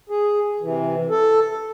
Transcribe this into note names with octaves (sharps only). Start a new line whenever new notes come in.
G#4
C3 E3
A4